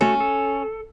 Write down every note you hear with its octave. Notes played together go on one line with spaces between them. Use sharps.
A3 C#4 F#4 A4
A4